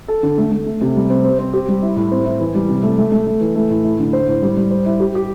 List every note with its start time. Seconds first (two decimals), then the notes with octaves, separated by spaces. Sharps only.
0.08 A4
0.23 D3
0.38 A3
0.52 A3
0.66 A3
0.81 C3
0.96 G3
1.10 C4
1.24 C4
1.39 C4
1.53 G4
1.68 G3
1.82 E4
1.96 A2
2.12 C4
2.25 E4
2.40 E3
2.55 G3
2.69 C3
2.83 A3
2.98 A3
3.12 A3
3.27 A3
3.41 E3
3.55 A3
3.70 A2
3.84 E4
3.99 D3
4.13 C5
4.28 A2
4.42 G3
4.57 G3
4.71 C5
4.86 E4
5.00 G4
5.15 G4